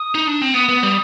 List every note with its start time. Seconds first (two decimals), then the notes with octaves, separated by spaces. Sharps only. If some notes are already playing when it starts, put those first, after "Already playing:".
Already playing: D#6
0.15 D#4
0.27 D4
0.41 C4
0.54 B3 D#6
0.69 B3
0.83 G3